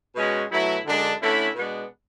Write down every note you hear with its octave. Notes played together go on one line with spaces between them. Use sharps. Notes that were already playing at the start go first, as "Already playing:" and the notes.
B2 G#3 C#4 F#4
B2 F#3 A3 E4
F#2 D3 G#3 D4
D3 A3 C#4 E4
B2 G#3 B3 D4